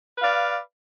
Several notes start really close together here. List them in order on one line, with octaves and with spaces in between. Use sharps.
B4 F5 D5